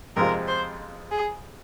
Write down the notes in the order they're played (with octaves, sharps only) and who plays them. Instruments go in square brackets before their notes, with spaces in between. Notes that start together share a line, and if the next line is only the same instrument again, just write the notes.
[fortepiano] F2 C3 G#3 C4 F4 [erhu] A#4
[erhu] C5
G#4